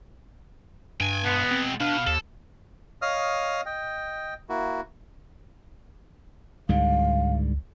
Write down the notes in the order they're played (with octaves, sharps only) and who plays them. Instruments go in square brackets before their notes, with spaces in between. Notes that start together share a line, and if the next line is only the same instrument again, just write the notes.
[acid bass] G2 [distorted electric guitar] G5 G#5
[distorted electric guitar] B2 G#3 [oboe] B3
[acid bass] C4
[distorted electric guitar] B2 B4 [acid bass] D4 [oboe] F5
[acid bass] D#2 [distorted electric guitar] A4
[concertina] C#5 D#5 F5 D#6 F6
D#5 G5
A#3 E4 F#4
[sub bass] C#2 [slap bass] G#2 D3 G3 [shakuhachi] F5